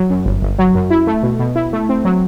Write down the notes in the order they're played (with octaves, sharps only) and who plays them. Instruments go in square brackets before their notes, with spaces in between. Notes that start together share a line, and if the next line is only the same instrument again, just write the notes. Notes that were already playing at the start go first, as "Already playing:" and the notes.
Already playing: [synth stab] F#3
F#2
G1
G1
F#3
F#2
E4
A3
B2
B2
E4
A3
C4
F#3